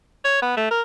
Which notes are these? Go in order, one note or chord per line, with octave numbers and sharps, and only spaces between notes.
C#5
B3
A3
A#4